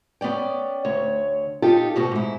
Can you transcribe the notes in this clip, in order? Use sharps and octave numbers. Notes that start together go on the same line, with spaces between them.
B3 C#4 D5 G5
D2 C#5
D#4 F4 G4 A4
D2 B2 F#4
G#2 E4